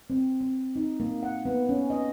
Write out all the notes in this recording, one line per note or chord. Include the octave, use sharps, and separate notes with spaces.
C4
C4
D#4
A#3
F#5
B3
C#4
D#5